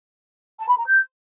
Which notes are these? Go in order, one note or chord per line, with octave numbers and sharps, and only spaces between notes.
A5
B5
A#5
G6